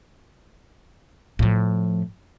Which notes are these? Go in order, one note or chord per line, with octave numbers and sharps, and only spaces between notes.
A2 F3